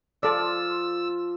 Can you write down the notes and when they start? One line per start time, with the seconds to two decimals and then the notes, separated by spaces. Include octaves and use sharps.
0.23 F3 F4 A4 D5 A5 E6